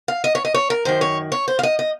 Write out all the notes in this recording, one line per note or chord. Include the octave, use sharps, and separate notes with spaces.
F5
D#5
C#5
D#5
C#5
A#4
F#2 D#3 C5
C#5
C#5
C5
F5
D#5
D#5